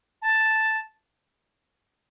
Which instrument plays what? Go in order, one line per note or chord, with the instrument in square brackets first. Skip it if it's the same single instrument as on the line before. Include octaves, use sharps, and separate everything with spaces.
[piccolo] A5